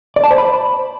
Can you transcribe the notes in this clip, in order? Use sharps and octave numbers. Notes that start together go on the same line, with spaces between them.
D5
A5
C5
B5